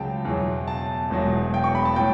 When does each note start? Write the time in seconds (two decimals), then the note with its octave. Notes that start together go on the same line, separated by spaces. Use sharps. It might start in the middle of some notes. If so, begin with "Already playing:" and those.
Already playing: C#2 C#3 F#3 G5 A5
0.25 E2 B2 F#3
0.68 A5
1.10 E1 E2 B2 F#3
1.54 G5
1.64 C#6
1.75 B5
1.85 A5
1.96 A2 F#3 G5